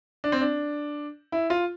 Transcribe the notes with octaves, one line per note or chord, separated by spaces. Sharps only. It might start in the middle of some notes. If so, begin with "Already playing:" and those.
D4
C4
D4
E4
F4